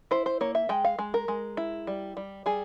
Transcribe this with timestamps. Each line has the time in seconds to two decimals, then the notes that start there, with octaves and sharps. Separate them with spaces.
0.11 E4 C5
0.26 C5
0.41 A#3 C#5
0.55 E5
0.69 G#3 G5
0.85 F5
0.99 G#3
1.14 A#4
1.28 G#3
1.57 E4
1.87 G3
2.17 G3
2.46 G3 G#4